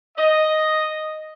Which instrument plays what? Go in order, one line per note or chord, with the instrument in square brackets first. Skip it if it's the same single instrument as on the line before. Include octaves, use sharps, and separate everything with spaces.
[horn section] D#5